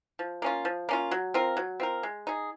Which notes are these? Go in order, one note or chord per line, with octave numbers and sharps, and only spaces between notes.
F3
A#3 C#4 F4
F3
A#3 C#4 F4
F#3
C4 F4 A#4
F#3
C4 F4 A#4
G#3
D#4 G#4